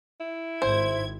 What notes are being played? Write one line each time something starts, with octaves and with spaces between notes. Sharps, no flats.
E4
G#1 C5 G#6